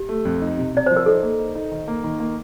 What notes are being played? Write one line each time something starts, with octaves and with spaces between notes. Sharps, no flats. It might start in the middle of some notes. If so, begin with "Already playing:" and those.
Already playing: G4
A3
F2
D#4
C3
C3 D5
F3 C5
A#4
D#4 A4
A#3
D#4
D#4
D#3
A#3
D#3
A#3